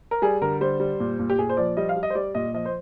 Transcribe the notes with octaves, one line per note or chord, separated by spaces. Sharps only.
A#4
G3 G#4
D3 A#4
G3 C5
G3
A#2
A#2
G4
A#2 G#4
C5
F3 D5
G3 D#5
F5
G3
D#5
C5
G3 D5
A#2 D#5
F3 D#5
C5